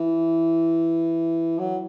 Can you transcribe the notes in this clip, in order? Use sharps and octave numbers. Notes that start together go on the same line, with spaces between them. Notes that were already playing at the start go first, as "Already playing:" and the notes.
Already playing: E3
F#3